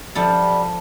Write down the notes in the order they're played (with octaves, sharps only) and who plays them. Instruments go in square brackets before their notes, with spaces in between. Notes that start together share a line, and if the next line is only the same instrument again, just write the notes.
[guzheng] F3 E4 A4 [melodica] G3